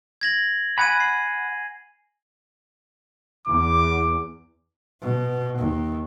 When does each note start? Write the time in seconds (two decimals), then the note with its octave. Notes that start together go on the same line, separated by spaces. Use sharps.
0.21 G#6 A#6 F#7
0.78 F#5 G#5 B5 G#6 D#7
1.00 C7
3.47 E2 D6
5.01 B2
5.59 D#2